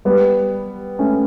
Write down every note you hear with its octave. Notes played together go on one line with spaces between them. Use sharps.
G3 B3
A3 C#4